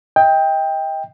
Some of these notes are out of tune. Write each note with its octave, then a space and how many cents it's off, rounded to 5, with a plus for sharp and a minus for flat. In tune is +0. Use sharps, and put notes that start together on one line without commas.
D#5 +35 G5 +15